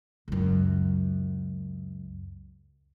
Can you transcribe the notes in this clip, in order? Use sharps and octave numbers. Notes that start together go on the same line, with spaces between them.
C#2 F#2